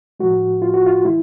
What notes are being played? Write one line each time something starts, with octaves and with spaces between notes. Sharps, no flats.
A2 F3 G#3 F#4
F4
F#4
F4
E3 G#3 E4